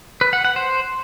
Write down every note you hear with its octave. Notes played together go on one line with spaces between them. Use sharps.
B4
F#5
F#5
C5